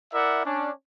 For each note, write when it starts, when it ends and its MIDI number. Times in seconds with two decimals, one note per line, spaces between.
0.13 0.42 64
0.13 0.42 70
0.13 0.42 74
0.13 0.42 76
0.13 0.42 78
0.45 0.70 61
0.45 0.70 62